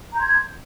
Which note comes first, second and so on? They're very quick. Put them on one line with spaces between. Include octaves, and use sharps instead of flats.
A#5 G6 C6 G#6